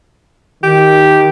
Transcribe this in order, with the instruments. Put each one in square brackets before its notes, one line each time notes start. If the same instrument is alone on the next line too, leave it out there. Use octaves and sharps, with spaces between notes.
[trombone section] D#3 [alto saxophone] G4